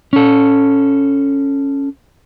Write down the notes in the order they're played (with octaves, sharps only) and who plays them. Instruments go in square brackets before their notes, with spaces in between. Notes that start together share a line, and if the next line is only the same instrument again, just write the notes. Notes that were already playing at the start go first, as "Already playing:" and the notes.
[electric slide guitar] C#4 A4